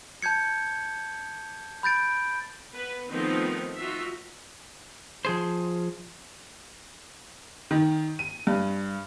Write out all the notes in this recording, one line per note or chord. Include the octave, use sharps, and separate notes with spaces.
A5 G6 G#6 C#7
B5 G6 A6 D7
B3 B4
D#3 F3 A3 B3 C4 D#4
D#4 F4 F#4 E5
F3 G#4 C5
D#3
D#7
G2